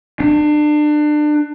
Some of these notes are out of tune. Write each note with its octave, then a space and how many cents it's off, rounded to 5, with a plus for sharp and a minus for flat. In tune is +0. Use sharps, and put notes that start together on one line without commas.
D4 +30